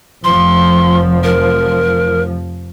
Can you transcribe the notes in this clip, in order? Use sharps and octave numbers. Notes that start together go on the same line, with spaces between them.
F1 F3 C6
A#4